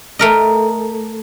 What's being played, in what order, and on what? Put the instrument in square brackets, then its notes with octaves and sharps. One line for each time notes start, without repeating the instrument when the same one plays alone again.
[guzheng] A3 A#4 D#5